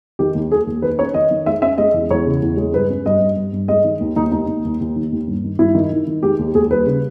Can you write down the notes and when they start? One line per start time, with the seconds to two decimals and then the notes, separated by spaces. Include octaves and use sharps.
0.19 D#3 G4
0.35 D#2
0.51 A#3 G#4
0.67 D#2
0.82 D#3 B4
0.99 C#4 C#5
1.14 D#3 D#5
1.31 D#3
1.46 G#3 E5
1.62 C#4 E5
1.78 G#3 D#5
1.94 E2
2.10 E2 C#5
2.26 C#3
2.42 E2
2.57 G#3
2.74 G2 B4
2.90 C#4
3.06 G2 D#5
3.21 G2
3.36 G2
3.53 G2
3.68 G#3 D#5
3.85 D#3
4.00 D#2
4.16 D#2 D#4
4.32 D#2 D#4
4.48 D#2
4.65 D#2
4.81 D#2
4.96 D#3
5.12 D#2
5.28 G2
5.44 D#3
5.59 G2 E4
5.75 D#3
5.92 D#3
6.07 D#3
6.23 G#3 G4
6.39 D#2
6.55 D#2 G#4
6.70 G3 B4
6.86 C#3